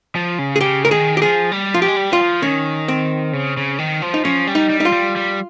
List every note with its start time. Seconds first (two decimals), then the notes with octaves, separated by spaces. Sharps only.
0.15 F3
0.39 C#3
0.56 G#4
0.61 C#3 G4
0.85 A#4
0.91 D#3 G#4
1.17 G4
1.22 F3 G#4
1.52 G3
1.74 F3 F4
1.82 G4
1.88 G#3
1.97 G3
2.13 F4
2.21 F3
2.42 D#3 C#4
2.88 C4
3.33 C#3
3.57 C#3
3.79 D#3
4.02 F3
4.14 D#4
4.25 F3 C#4
4.47 G3
4.55 D#4
4.70 G3
4.80 D#4
4.85 F4
4.92 G3
5.16 G3